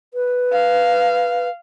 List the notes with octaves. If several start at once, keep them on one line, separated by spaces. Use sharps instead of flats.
B4
F5